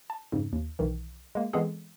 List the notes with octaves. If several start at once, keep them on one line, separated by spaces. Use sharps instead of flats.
A5
F2 G#2 C#3
D#2
B1 D#3 E3
G#3 A#3
E3 G#3 B3 C4 G#4 A4